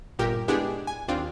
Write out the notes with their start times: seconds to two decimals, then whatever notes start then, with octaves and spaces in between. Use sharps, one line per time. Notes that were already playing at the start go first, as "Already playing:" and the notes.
0.19 G1 A#2 G4 A#4
0.48 G#3 B3 D4 E4 G4 G#4
0.87 G#5
1.08 D#2 C4 D4 F4